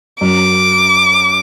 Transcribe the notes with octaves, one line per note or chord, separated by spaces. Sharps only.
F#2 D6